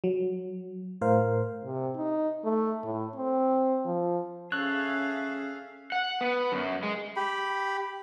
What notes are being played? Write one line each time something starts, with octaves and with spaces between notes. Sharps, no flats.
F#3
A2 A#4 C5 F5
C3
D#4
A3
A2
C4
F3
C#4 G#4 A4 C#5 E5 F5 F#6
F#5
B3
F#2
G#3
G4 B5